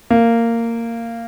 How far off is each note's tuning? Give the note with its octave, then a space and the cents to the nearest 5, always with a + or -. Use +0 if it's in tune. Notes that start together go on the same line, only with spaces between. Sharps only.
A#3 -15